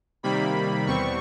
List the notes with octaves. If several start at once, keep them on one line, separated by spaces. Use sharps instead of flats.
C3 D#3 G3 A#3 B5
E2 B2 G3 C4 C#6